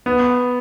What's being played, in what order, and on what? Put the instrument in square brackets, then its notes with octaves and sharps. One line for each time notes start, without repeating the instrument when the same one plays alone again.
[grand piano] B3